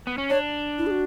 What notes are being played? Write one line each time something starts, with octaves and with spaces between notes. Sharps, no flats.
B3
C#4
D4 C#5
E4
G#4
F#4